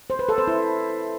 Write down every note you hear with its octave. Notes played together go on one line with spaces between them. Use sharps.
C5
B4
A4
C5
E4